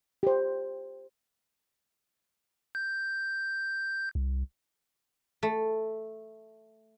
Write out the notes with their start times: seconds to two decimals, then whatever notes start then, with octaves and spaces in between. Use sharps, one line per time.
0.23 G4 C5
2.75 G6
4.15 C2
5.43 A3